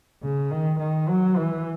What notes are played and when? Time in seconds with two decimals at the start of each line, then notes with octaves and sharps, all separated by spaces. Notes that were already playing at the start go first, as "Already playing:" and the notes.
0.23 C#3
0.51 D#3
0.79 D#3
1.09 F#3
1.36 E3